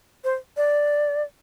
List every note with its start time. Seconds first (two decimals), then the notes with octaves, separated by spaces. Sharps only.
0.24 C5
0.57 D5